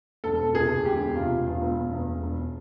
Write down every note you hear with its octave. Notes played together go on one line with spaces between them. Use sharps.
E1 A4
E1
C3 G#4
D2
E1 G4
E1
C3 F4
E1
E2 F4
E1
E1
E2
E1
E1